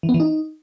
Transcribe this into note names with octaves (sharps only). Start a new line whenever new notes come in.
E3
B3
E3
D#4